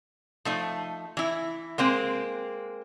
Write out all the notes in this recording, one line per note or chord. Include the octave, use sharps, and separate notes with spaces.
F3 A3 D#4
E3 E4
G#3 A#3 C4